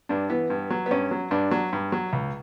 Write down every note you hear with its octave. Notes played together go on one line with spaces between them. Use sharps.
G2 D4
E3 B3
G2
F#3
B3
G2 C#4
F#3
G2 D4
F#3
G2
F#3
C#2